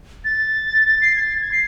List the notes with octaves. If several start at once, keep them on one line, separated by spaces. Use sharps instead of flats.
A6
C7
G#6
A6
G#6
C7